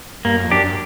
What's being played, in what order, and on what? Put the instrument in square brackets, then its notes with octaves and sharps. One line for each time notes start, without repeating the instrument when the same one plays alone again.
[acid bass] G2 [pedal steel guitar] A#3
[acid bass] F#2
F2
[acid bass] F#2 [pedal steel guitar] D4 G4